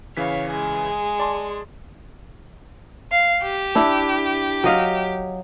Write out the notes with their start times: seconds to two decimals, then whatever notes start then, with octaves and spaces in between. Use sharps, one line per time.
0.17 C#3 E3 C#5 F5 B6
0.50 G#3 G#4
1.19 D5 A5 C6
3.11 F5
3.42 G4
3.75 D4 E4
4.64 F#3 D#5 F5